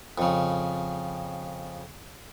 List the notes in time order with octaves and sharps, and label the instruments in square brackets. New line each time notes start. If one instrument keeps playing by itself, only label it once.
[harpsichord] F2 C#3